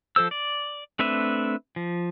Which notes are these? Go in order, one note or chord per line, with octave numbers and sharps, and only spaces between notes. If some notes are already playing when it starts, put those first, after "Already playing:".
F3 A4 C5 E6
D5
A3 C4 D4 B4 E5
F3